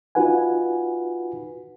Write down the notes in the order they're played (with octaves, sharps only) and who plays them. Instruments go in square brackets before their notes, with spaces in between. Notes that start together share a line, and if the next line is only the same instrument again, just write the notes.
[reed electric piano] D#4 F4 F#4 B4 F#5 G#5